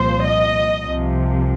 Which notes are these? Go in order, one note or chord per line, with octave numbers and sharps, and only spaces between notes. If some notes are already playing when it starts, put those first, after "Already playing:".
Already playing: C2 A#2 F3 C5
D#5
C2 C3 F3